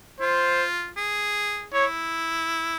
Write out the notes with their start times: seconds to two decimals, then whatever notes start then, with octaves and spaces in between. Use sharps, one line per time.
0.20 F4 C5
0.97 G#4
1.73 E4 C#5